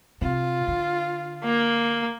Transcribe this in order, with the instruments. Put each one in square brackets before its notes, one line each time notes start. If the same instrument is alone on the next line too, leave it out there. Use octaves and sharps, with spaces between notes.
[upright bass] C3 [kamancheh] F4
[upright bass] D3
[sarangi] A#3